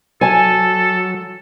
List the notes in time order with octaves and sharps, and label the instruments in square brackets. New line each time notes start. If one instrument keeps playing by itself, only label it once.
[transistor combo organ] F#3 [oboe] A4 [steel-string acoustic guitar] G#5 A5